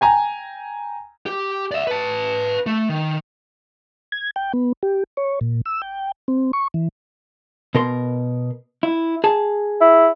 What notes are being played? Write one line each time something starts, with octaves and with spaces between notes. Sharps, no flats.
G5 G#5 A#5
G4
D5 E5
B4 A5
A3
D#3
G#6
G5
B3
G4
C#5
A#2
E6
G5
C4
C#6
E3
B2 A#4 C6
E4
G#4 A5
E4